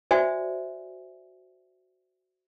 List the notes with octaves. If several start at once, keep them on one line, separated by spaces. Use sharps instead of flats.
F#4 C5 D5 E5 G#5